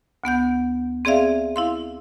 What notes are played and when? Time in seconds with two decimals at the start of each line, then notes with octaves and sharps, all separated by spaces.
0.24 D2 B3 F#5 G6
1.05 C4 G#4 D5 E5 F5
1.56 E4 F5 C6